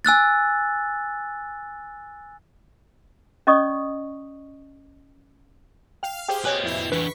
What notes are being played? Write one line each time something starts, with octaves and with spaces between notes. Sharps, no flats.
G#5 E6 F#6 A6
C#4 D5 D#5 C#6 D#6
F5 G5 F6
G4 G#4 C5 G5
B4 C#5 D#5 G#5 F#6
F2 E4 C7
E3 D4 B4 C#6 B6